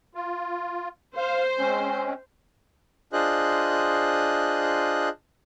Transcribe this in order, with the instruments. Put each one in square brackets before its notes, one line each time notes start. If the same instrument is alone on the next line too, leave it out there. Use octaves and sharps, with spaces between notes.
[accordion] F4
[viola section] C5 [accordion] F5
[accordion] G#3 C4 C#4
[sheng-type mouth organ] D4 F4 G#4 C5 D#5 F#6